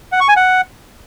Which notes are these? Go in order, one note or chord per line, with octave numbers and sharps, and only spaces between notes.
F#5
C#6
G#5
F#5